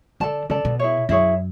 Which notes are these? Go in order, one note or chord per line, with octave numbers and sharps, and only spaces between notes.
D3 A4 D5 A5
C#3 A4 D5 A5
B2
E4 G#4 C#5
F#2 E4 G#4 C#5